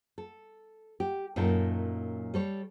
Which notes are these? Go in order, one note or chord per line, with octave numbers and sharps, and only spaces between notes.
A4
G4
F#2 A#2 A3 D#4 A4 A#4
G3 A4 C#5